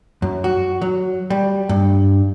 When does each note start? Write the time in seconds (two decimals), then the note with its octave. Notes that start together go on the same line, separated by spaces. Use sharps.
0.22 F#2
0.44 F#4
0.82 F#3
1.30 G3
1.69 G2